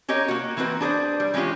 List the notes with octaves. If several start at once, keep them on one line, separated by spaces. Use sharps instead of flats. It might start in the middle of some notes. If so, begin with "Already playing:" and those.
C#4 G4 A#4 C#5 D#5
A#3 F#4
E3 A#3 C4 F#4 B4
D4 G#4 B4 C5 D5
G3
E3 G#3 C#4 F4 G4